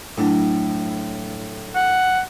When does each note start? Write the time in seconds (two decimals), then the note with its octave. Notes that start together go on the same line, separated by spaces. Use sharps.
0.18 A2 F#3 D4 E4
1.75 F#5